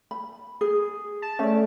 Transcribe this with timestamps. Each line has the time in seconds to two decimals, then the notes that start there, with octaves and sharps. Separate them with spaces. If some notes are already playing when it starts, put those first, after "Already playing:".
0.11 B5
0.61 G#4
1.22 A5
1.39 A3 C#4 D5